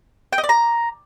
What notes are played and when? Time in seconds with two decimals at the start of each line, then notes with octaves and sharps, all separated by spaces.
0.33 G5
0.38 D#5
0.44 D5
0.49 A#5